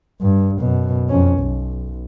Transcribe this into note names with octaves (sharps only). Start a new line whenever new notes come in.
G2
F#2 B2
F2 C#4
B1